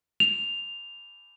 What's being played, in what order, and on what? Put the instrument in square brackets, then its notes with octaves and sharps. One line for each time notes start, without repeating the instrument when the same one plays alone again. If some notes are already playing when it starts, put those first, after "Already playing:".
[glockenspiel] F7